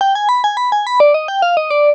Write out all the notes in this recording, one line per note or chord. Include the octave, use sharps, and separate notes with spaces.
G5
G#5
B5
G#5
B5
G#5
B5
D5
D#5
G5
F5
D#5
D5